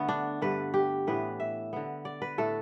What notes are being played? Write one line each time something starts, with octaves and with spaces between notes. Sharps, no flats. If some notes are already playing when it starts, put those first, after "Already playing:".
Already playing: D3 A3 B3
D4
G2 D3 A3 B4
G4
A2 E3 B3 B4
E5
D3 B3
D5
B4
A2 A3 A4